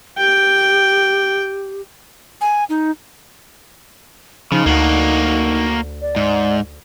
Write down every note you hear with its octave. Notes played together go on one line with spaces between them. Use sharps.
G4 G5
G#5
D#4
C#3 F3 D#4
D2 A#3 F#4
D5
G#2